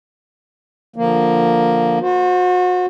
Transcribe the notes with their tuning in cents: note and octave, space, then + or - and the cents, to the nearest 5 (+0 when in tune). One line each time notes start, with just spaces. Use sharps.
D3 -5 F3 +0 A#3 +0
F#4 -35 C5 +0